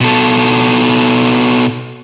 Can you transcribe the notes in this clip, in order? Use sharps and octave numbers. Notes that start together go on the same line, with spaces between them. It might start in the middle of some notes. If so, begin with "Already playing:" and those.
B2 A4